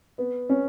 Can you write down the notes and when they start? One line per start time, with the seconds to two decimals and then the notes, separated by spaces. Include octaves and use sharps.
0.18 B3
0.49 C#4